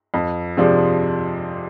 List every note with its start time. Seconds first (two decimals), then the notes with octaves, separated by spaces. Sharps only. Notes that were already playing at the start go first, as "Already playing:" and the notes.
0.14 F2
0.57 C3 F3 G#3 D4